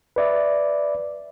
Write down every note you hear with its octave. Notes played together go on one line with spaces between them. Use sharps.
B4 D5 E5